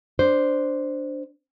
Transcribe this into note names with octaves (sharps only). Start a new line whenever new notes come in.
D4 C5